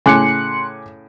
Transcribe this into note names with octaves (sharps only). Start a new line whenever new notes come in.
A2 C#3 G#5 C6 D6 F#6 C#7